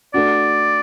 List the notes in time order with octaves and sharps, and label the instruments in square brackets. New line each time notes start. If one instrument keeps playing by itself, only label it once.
[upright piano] A3 D4 F#4 [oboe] D5